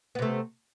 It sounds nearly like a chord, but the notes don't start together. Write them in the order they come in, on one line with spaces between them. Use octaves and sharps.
B3 C3 A3